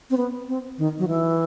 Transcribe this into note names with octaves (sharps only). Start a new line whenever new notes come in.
C4
B3
C4
D#3
F#3
E3